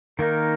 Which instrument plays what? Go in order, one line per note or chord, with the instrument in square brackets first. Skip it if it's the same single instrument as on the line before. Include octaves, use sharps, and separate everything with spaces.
[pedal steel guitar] D#3 A#3 D#4 [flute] A#4